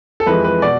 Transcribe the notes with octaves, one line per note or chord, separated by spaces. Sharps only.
A4
F2 E3 G#3 B4
B4
B2 D5